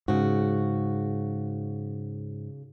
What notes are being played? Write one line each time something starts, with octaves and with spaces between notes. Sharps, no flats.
G#2 C#3 F#4